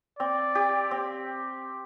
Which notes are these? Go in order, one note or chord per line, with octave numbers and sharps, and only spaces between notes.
C4 D5
G4
C4